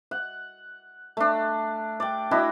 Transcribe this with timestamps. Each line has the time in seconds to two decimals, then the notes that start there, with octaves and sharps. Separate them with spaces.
0.11 F#5
1.17 A3 D4
2.00 D5 G5
2.31 D4 E4 F#4 D#5